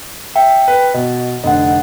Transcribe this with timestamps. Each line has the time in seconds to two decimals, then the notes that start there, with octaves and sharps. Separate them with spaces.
0.36 E5 G5
0.68 B4
0.94 B2 D#5
1.44 F1 D3 D#5 F#5